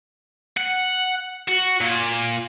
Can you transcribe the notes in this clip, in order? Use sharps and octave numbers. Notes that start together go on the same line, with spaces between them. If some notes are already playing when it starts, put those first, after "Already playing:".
F#5
F#4
A#2